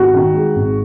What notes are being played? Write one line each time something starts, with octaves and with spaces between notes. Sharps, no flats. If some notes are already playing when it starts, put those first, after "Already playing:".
Already playing: G#1 F#4
D#3
G#3
G#1